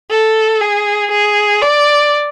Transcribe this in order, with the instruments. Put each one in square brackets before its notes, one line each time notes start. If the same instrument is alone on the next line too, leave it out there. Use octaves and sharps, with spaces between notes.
[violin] A4
G#4
G#4
D5